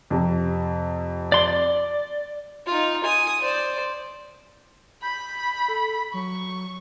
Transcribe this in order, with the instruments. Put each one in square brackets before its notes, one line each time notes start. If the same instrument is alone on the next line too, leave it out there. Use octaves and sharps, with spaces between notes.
[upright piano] F2 C3
[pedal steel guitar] D5 C6
D5
[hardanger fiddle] D#4 F4
G#5 D#6
C5 D5
[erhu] B5 [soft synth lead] G6
[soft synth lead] A4
[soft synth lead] F#3 [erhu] C#6